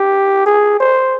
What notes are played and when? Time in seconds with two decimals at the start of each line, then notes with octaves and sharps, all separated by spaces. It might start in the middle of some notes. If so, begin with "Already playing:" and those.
Already playing: G4
0.46 G#4
0.80 C5